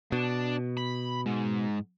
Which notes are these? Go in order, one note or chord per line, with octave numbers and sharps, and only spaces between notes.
B2 D4
B5
G#2